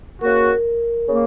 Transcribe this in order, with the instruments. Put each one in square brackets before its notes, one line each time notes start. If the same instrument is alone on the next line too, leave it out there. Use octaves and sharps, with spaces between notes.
[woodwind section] C#3 A#3 F#4 [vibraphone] A#4
[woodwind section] C#3 A#3